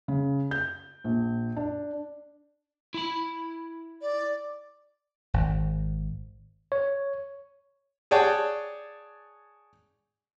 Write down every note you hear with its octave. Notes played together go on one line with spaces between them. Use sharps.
C#3
G6
A#1
D4
E4 B5
D5
G#1
C#5
G#4 C#5 D5 F#5 G5 A5